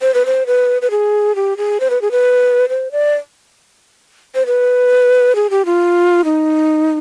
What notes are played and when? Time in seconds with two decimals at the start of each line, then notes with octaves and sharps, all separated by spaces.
0.02 C5
0.14 B4
0.26 C5
0.47 B4
0.82 B4
0.91 G#4
1.36 G4
1.57 G#4
1.80 C5
1.90 B4
2.02 G#4
2.11 B4
2.69 C5
2.92 D5
4.35 C5
4.46 B4
5.35 G#4
5.50 G4
5.66 F4
6.25 D#4